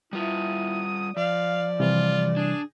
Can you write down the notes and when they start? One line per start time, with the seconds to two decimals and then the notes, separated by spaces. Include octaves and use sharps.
0.13 G3 E4 F4 D#6
1.17 F3 D5 F5
1.80 C3 E3 G3 F4
2.37 D4 G#4